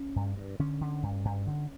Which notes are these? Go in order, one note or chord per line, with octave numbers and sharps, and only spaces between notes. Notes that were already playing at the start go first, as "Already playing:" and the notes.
Already playing: C#4
G2
G2
D3 C#4
D3
G2
G2
D3